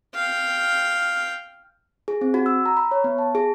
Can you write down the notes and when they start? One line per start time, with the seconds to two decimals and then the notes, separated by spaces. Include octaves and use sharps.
0.15 F5 G5
2.08 G#4
2.21 C4
2.34 F#4
2.46 E6
2.66 A#5
2.77 B5
2.91 C#5
3.04 B3
3.18 A5
3.35 G#4